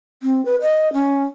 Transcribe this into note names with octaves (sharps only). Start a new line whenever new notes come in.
C4
B4
D#5
C#4